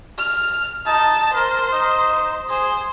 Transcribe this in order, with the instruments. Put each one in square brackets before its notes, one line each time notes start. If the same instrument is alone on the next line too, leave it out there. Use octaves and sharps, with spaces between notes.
[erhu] F6
[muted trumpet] D#4 [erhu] A5
[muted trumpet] A#4 [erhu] C5
[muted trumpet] D#4
[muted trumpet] G#4 [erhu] C5